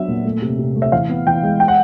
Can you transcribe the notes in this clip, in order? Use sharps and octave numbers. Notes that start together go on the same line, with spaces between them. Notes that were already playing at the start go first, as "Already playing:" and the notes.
Already playing: F#3 B3 D4 E5
A#2
A3
C3
C3
A3
E5
E3 F5
B3
E3 G5
G#3
G5
F#5